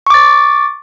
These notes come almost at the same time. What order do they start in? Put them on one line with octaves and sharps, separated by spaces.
C#6 D6 A6